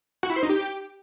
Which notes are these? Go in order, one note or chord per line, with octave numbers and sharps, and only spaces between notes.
F#4
E4
C5
D#4
G4